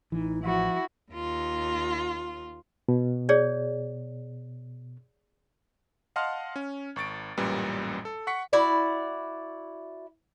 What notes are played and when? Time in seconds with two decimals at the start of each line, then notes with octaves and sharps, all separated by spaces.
0.12 A1 E3 D#4
0.43 F3 E4 F#4
1.12 D#2 F4
2.89 B2
3.29 G#4 C#5 D5
6.16 D#5 F5 F#5 A5 C6 F6
6.56 C#4
6.96 G#1 C#6 A6 D7
7.37 A1 F#2 A#2 G3 B4
8.05 A4
8.27 F#5 C#6 B6 C#7
8.53 E4 F#4 D5